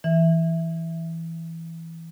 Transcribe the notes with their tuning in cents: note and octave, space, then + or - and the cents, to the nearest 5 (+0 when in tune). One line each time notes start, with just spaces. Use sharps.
E3 +0 E5 +0